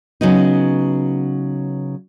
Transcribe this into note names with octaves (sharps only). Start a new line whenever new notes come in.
C#3 F#3 B3 D#4